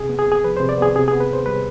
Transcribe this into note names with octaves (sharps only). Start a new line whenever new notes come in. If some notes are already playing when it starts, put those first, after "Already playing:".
Already playing: C3 G#4
B3
G#4
C2
G#4
F3 B4
C3 C5
D5
B3 G#4
C3 G#4
B3 G#4
B4
D2 C5
G3 B4